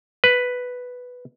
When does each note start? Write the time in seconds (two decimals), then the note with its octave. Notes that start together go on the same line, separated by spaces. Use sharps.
0.24 B4